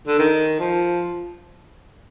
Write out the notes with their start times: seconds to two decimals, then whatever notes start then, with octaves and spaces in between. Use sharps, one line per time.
0.08 D3
0.19 D#3
0.60 F3